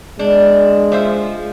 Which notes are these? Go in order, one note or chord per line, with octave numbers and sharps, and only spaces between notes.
G#3 D4
F3 C5 E5